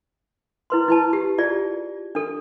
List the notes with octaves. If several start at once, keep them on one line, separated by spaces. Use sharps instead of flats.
E4 B4 C6
E4 B4 A5
G4
F4 G#4 D5
D4 A4